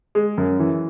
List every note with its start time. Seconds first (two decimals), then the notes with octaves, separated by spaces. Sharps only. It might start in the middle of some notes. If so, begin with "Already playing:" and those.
0.15 G#3
0.38 F#2
0.60 E3